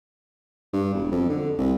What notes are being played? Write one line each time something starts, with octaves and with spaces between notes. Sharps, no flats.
G2
E1
F2
D3
C2